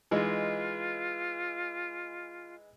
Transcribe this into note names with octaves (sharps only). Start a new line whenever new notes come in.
E3 G#3 D#4 F4